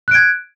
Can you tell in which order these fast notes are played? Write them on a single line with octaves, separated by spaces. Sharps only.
F#6 D7 G#6